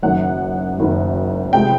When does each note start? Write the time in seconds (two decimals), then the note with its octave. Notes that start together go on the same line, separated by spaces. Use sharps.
0.02 F#1 F#2 D#3 F#3 F#5
0.77 F#1 F#2 D#3 F#3
1.52 C#2 C3 F3 G#3 G5